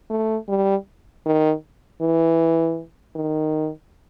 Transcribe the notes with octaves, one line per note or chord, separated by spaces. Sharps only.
A3
G3
D#3
E3
D#3